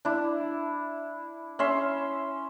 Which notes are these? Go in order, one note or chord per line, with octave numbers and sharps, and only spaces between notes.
D4 E4
C#4 E5 C6